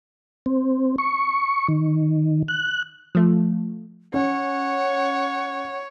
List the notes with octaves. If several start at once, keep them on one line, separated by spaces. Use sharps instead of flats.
C4
C#6
D#3
F#6
F3 A3
C#4 C#5 F#5